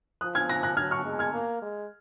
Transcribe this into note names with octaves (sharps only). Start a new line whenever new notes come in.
F3 D#6 F#6
F6 G#6
F#6 A#6
F#6 A#6
F#3 F6 G#6
C#6 F6
G#3
F6 G#6
A#3
G#3